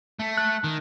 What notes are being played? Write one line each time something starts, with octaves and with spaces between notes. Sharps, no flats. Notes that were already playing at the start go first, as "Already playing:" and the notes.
A3
F#6
D#3